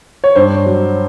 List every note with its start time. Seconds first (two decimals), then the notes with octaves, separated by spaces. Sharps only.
0.24 C#5
0.35 G2 C5
0.66 F#3